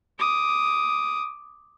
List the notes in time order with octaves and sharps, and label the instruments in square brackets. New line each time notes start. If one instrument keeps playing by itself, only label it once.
[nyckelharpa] D6 D#6